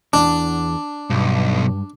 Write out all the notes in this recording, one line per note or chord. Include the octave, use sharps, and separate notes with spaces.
E2 D4
B1 G2